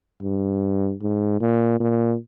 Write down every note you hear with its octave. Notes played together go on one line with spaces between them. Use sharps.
G2
G#2
A#2
A#2